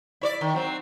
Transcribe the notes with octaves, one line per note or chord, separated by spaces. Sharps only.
E4 C#5 D5
D#3
F#3 C4